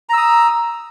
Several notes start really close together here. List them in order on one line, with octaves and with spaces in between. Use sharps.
A#5 E6 D#6